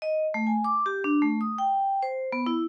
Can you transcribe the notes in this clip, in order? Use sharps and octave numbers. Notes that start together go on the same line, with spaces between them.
D#5
A3
G#5
D6
G4
D4
A3
D#6
G5
C5
B3
E4